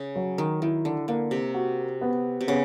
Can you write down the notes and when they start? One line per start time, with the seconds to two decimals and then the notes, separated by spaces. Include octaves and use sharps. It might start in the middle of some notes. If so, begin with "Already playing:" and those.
Already playing: C#3
0.16 F#3
0.38 D#3
0.62 D#3 E4
0.85 D3
1.08 D3 A#3
1.31 C3
1.54 F#4
2.01 B3
2.41 C3
2.48 C#3 B3